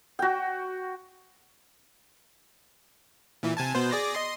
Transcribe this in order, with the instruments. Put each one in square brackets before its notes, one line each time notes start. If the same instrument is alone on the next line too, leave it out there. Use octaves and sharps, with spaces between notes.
[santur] F#4 G5
[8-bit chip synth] A#2 E3
C3 G#5 A5
B2 B3 C5
G#4 D5 A#6
D#5 C6